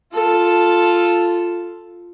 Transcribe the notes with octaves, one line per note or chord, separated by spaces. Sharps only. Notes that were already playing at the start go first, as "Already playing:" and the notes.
F4 A4